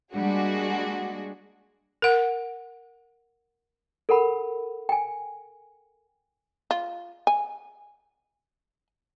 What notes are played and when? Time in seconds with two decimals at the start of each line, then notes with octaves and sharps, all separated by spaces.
0.13 G3 G#3 A#3 D4 F#4 G#4
2.02 A#4 F#5
4.09 A4 A#4 F#5 B5
4.89 G5 G#5
6.71 F4
7.27 G#5